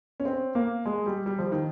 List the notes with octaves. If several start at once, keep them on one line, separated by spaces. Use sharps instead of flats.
C#4
C4
A#3
G#3
G3
G3
F3
D#3